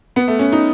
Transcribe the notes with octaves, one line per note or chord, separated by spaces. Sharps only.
B3
A3
C#4
D#4